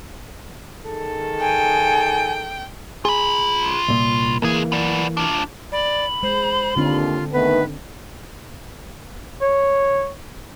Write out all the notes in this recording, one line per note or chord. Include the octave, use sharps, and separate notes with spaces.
D#3 G#4 A4
G5 G#5
F4 G#4 B5
C2 A#2
C#2 E3 A#3 G#4
B3 D5
D4 F4
D5 B5
G#3 C5
D#2 D3 C4 D4 F4
D#3 A3 B3 B4
C#5